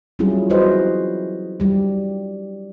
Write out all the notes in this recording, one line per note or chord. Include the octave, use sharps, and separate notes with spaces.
F#3 G3 C#4 E4 F4 G#4
G3 E4 F#4 B4 C5 D#5
G3 G4